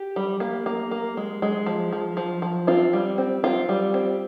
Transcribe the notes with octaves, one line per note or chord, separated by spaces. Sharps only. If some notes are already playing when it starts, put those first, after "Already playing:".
Already playing: G4
G3
A#3
A#3
A#3
G#3
G#3
F3
F3
F3
F3
C4 F4
G3
C4
C4 F4
G3
C4